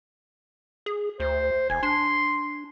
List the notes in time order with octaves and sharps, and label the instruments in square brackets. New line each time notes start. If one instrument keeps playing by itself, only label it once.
[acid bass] G#4
[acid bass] D2 [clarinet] C5
[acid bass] E1 [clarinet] G#5
[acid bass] D4 [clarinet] C6